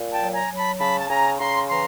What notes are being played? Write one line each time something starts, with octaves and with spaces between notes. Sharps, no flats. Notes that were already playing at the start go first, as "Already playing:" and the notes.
Already playing: A#2
G5 A5
F#3
G#5 A#5
F#3
A5 B5
C#3 A5 B5
A5
C#3 G#5 A#5
C#3 A#5 C6
E3 A#5 C6